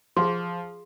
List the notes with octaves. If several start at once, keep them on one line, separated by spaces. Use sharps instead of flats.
F3 G#4 F5 C6